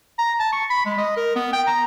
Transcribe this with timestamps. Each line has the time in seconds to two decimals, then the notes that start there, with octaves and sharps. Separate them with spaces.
0.18 A#5
0.39 A5
0.52 C#6
0.70 B5
0.85 G#3
0.98 D#5
1.17 A#4
1.36 B3
1.53 G5
1.67 A#5